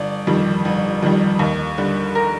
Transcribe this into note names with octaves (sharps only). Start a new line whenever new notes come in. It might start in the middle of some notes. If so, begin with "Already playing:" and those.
Already playing: G1 D5
F2 D#3 G3
G1
F2 D#3 G3
D#2
D3 G3
A#4